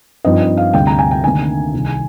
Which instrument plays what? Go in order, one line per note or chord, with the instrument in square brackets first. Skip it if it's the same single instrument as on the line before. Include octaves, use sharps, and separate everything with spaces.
[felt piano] G2 F3 C4 D#4 D#5
D#5
F5
D2 C3 G3 G5
A#5
G#5
G5
D2 C3 D#3 A#3 D4 G#5
C2 C3 D#3